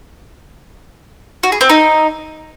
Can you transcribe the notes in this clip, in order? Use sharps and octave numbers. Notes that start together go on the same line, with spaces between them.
F#4
G#4
C4
D#4